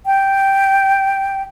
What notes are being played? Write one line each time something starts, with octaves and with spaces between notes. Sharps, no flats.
G5